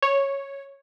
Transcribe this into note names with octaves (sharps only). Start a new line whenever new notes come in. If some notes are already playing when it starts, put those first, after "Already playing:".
C#5